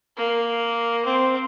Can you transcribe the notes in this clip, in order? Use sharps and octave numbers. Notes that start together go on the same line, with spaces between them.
A#3
C4